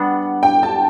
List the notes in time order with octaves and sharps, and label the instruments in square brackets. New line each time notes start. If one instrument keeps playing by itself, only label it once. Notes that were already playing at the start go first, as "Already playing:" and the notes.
Already playing: [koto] G3 B3 D4 [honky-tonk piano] F#5
[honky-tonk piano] G5
A5